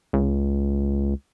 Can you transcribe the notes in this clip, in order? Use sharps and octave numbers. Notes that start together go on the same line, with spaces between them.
C#2